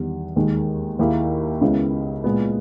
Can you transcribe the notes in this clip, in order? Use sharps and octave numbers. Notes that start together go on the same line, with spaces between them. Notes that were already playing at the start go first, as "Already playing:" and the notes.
Already playing: E2 D#3 G3
D#2 D#3 G#3
D#2 D#3 A#3 E4 G#4
C#2 C#3 G#3 B3 E4
A#2 G#3 B3